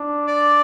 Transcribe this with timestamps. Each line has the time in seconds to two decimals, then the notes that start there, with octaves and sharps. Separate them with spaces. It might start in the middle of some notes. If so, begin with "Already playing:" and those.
Already playing: D4
0.27 D5